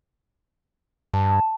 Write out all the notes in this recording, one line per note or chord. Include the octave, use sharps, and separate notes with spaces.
G2 A5